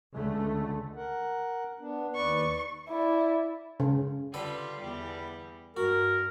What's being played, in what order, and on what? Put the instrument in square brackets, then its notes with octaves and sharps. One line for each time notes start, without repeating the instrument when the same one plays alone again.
[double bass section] C#2 D3 A3
[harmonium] A#4 F#5
B3 D4
[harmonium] D#2 B4 D5 [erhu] C#6
[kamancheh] E4 D5
[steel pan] C#3
[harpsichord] D3 A4 B4 [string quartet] G3 F4
[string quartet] E2 G3
[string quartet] G2 [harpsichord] F#4 [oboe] A#4